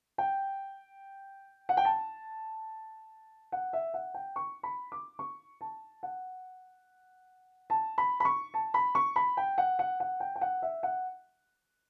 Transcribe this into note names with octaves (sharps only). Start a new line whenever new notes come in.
G5
F#5
G5
A5
F#5
E5
F#5
G5
C#6
B5
D6
C#6
A5
F#5
A5
B5
B5
C#6
A5
B5
C#6
B5
G5
F#5
F#5
F#5
G5
G5
F#5
E5
F#5